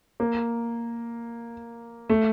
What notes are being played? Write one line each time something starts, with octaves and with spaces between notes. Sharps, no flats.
A#3
A3